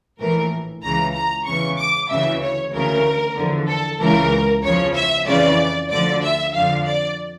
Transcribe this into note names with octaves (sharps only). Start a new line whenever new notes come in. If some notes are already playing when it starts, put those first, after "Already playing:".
A#1 A2 E3 A#4
C#2 C#3 E3 A#5
A#5
E2 C#3 E3 C#6
D6
D2 C#3 E3 E5
C#5
D2 C#3 E3 A#4
E2 D3 F3
A4
C#2 C#3 E3 A#4
E2 C#3 F3 C#5
E5
F2 C#3 E3 D5
D2 D3 F3 D5
E5
F2 D3 F3 F5
D5